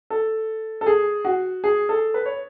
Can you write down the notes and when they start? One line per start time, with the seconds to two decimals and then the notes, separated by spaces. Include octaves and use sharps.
0.10 A4
0.81 A4
0.86 G#4
1.25 F#4
1.64 G#4
1.89 A4
2.14 B4
2.26 C#5